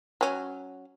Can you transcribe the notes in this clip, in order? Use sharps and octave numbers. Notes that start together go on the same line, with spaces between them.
F#3 C#4